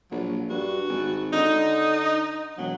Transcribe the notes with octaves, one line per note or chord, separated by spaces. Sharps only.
A#1 F#3
G2 F#4
G#1
D3 D#4
E1 F#3